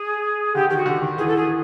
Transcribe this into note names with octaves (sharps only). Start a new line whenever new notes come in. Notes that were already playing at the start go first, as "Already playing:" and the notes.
Already playing: G#4
D3 G4
D#3 G4
F#4
D3
D#3
E3 G#4
A4
G#4